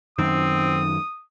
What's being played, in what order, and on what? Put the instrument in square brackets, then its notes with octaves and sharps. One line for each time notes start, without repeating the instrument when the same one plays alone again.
[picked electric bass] F#2 D#3 [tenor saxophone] C4 [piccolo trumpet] D#6